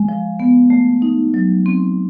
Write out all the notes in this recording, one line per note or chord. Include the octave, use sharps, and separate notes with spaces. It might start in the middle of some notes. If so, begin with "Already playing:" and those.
Already playing: G#3
F3
B3
A3
D#4
F#3
C4